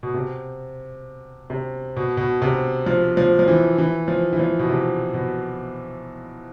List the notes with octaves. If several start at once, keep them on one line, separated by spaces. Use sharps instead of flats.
B2
C3
C3
B2
B2
C3
F3
F3
F3
E3
E3
F3
E3
F3
B2
C3
B2